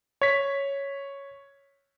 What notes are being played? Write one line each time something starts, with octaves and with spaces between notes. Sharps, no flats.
C#5 B6